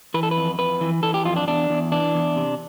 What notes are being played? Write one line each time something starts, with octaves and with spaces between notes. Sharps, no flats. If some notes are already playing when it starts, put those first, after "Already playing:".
E3 B4
A4
B4
F2
F2 B4
E3
E3 A4
G4
F2 F4
D4
E2 D4
E2
E3 D4
E2
C3